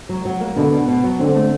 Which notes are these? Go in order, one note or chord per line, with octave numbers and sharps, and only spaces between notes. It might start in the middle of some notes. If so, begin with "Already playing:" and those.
F#3
F#3
A#3
B2 D3
B2
B2
F#3
D3 C4
A3